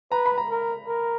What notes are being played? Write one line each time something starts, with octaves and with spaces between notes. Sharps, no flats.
B4 A#5
B5
A#5
A#4
A#4